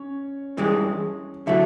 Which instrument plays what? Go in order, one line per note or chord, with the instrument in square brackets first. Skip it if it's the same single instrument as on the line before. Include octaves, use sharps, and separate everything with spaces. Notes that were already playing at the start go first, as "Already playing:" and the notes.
Already playing: [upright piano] C#4 C#5
[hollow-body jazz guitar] G2 E3 G#3
[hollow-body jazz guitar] D3 F#3 A3 [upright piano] E4 E5